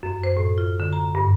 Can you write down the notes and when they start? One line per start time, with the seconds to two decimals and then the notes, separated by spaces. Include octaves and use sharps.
0.03 F#2
0.24 C5
0.37 A2
0.58 F4
0.80 D3
0.93 A#5
1.15 G2